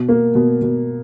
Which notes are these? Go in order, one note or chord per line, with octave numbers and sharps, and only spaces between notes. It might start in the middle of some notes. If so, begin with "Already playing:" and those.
Already playing: B2
A#3
B2
B2